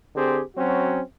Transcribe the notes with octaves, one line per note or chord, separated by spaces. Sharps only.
D3 C4 G4 G#4
F#3 C4 C#4 F#4